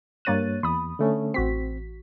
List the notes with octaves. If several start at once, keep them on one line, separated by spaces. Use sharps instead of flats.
G2 A#3 C#5 F#6 A6 D#7
E2 B5 D#6
D3 A3 C#4
A1 C4 F#4 B6